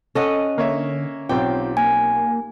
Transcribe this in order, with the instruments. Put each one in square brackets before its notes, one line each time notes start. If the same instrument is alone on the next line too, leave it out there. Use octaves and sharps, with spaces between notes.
[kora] C#4 D#5 F#5 [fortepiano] A4
[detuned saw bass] D3 [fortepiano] A#3 C#5 E5
[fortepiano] B1 C4 G5 [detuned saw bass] F4 [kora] G4
[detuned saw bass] A#3 [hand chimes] G#5